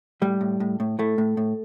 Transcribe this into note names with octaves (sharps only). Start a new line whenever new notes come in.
A2 G3
A2
A2
A2
A2 A3
A2
A2